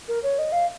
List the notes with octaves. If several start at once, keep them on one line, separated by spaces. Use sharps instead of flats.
A#4
C#5
D#5
F5